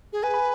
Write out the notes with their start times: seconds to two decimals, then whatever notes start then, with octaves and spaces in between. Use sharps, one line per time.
0.13 G#4
0.23 B4 G#5
0.34 B5